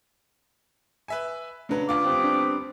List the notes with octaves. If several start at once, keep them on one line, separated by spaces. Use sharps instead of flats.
B4 E5 G#5
C#3 F#3 A3 D4 B4
D2 F4 D6
G3 B3 C4
D4